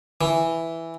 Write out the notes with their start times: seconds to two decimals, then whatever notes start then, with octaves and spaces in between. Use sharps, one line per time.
0.21 E3